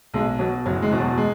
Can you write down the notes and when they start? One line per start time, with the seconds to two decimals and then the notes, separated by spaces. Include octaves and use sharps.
0.14 B1 G#3
0.39 B2 F#3
0.66 F#1 F#3
0.82 G#3
0.91 E2 B2
1.00 F#3
1.18 G#3